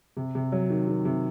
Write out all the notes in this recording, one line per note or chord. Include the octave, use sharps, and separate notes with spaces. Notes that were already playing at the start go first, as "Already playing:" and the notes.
C3
C3
F#3
D#3
D#3
C3